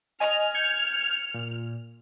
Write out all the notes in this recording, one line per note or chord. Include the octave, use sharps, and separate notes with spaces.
D#5 G#5 F6
G6 G#6 C#7
A#2